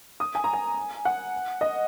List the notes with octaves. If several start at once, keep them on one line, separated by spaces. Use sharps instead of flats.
D#6
G#5
A#5
G#5
F#5
D#5